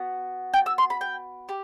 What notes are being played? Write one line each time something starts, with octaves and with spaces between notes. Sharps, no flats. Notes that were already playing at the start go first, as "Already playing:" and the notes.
Already playing: B3 F#4
G5
E6
C6
B5
G5
G4